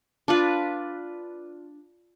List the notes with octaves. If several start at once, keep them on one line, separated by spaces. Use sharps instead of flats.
D4 F4 B4